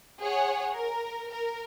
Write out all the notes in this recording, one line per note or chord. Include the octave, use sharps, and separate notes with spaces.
G#4 C#5 F#5
A#4
A#4